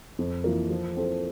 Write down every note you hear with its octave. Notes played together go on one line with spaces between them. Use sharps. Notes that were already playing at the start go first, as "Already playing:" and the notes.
F2
E3 A#3 F4 A#4
F3
C4 E4 A4